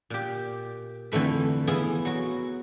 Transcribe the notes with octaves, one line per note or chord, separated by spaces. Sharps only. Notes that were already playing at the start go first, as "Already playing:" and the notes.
A#2 G4
F2 D3 E3 A3 B4
E3 B3 E4 F4 G#4
F#3 F#4